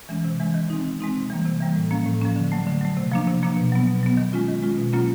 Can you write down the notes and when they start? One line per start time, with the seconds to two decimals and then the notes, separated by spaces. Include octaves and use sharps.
0.09 E3 G#3 C#4
0.24 C3
0.40 E3 G#3 C#4
0.54 D#3
0.70 G#3 C4 D#4
0.84 D#3
1.01 G#3 C4 D#4
1.15 C3
1.30 E3 G3 A#3
1.45 C3
1.60 E3 G3 A#3
1.76 A2
1.91 F3 A#3 C#4
2.06 A2
2.21 F3 A#3 C#4
2.36 D3
2.52 F#3 A3
2.67 D3
2.81 F#3 A3
2.97 C3
3.12 F3 A#3 D4
3.27 C3
3.42 F3 A#3 D4
3.57 B2
3.72 F#3 B3
3.87 B2
4.03 F#3 B3
4.17 D#3
4.33 G#3 C#4 F4
4.48 D#3
4.63 G#3 C#4 F4
4.78 B2
4.93 F#3 A#3 C#4 F4